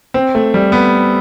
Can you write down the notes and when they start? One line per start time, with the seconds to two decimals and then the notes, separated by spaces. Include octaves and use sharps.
0.14 C4
0.35 A3
0.54 G3
0.72 B3